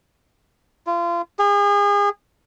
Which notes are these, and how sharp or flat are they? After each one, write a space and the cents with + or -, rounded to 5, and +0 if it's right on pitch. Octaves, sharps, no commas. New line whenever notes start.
F4 -30
G#4 -35